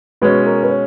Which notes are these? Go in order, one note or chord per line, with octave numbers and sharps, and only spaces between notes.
B2 G#3 C#4 B4
A#4
B4
C#5